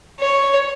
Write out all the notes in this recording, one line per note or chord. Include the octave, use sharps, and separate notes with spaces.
C#5